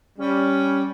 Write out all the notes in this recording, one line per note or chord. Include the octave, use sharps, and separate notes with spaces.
G3 C#4